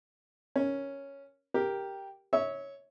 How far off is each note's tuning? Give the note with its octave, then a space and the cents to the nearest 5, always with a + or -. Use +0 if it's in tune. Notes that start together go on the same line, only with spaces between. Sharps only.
C#4 +0 A#4 +0
G4 +0 A#4 +0
C#5 +0 E5 -30